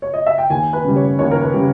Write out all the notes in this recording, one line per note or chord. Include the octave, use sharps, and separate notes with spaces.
C#5
D#5
E5
G5
D#2 G#5
B4
C#3 G3
C#5
D#2 C#5
A#4
B4
C#3 G3